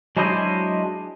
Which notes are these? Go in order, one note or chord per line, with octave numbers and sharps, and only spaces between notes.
F#3 G#3 D4 E4 C5 D#5